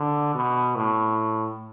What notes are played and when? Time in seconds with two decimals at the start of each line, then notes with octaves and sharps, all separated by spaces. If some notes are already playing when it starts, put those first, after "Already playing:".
Already playing: D3
0.35 B2
0.76 A2